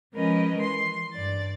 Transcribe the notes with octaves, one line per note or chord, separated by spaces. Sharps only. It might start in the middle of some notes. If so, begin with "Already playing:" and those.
F3 G#3 C#4 A#4 B4 D#5
E3 C6
G2 D5 A6